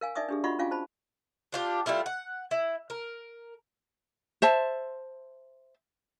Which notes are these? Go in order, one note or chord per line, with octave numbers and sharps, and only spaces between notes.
A#4 F5 G#5
D#4 D5 E5 G#5 D6 D#6
D4 G4 G#4
F4 F#4 D#5 F#5 B5 C#6
C#4 F4 F5 G#5 D6
C5 A5 B5
D4 F4 G4
G3 A3 E4 F4
F#5
E4
A#4
C5 E5 A5